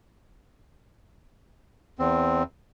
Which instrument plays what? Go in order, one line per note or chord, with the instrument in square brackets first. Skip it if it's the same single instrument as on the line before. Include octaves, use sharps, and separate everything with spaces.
[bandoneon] E2 C4